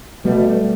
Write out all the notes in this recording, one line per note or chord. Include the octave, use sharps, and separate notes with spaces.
B2 G3 A3